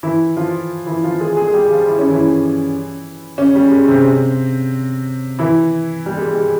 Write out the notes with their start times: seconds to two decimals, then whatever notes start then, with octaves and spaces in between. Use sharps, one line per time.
0.03 E3 E4
0.36 F3 F4
0.86 E3 E4
1.03 F3 F4
1.20 G#3 G#4
1.37 G#3 G#4
1.47 G#4
1.54 G3 G4
1.71 F3 F4
1.87 E4
1.98 C#4
2.10 E3 E4
3.38 C#3 C#4
3.55 G3
3.72 G#3
3.88 C3 C4
5.39 E3 E4
6.06 G3
6.17 G#3
6.28 G3
6.40 G3